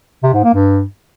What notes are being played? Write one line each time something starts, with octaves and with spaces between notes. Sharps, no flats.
C3
G#2
A#3
G2